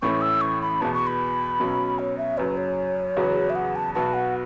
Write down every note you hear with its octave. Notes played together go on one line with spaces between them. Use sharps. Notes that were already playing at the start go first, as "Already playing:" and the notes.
A1 A2 E3 A3 C#4 C#6
E6
C#6
B5
E2 B2 B3 A5
C#6
B5
B1 B2 F#3 C#4
C#5
E5
F#1 F#2 F#3 B4
C#5
E2 C#3 F#3 B3 F#4
E5
F#5
A5
B1 B2 B3 F#4 A5
F#5